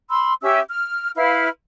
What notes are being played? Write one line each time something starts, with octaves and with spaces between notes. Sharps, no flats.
B5 C6 E6
C#4 G4 E5 E6
F6
E4 B4 F5 F6